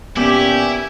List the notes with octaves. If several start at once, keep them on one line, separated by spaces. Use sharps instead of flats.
A#2 B3 C#4 E4 G4 G#5